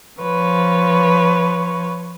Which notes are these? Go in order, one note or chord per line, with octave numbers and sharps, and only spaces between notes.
F3 B4 C#5